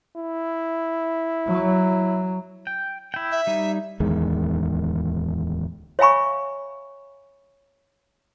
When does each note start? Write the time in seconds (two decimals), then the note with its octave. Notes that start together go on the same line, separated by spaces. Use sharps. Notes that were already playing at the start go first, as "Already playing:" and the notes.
0.18 E4
1.47 F#3
2.67 G5
3.14 E4 G5
3.32 E5
3.47 G3 D#4
4.00 D1 E2 D#3 G#3
5.99 C#5 E5 F5 G#5 B5 C#6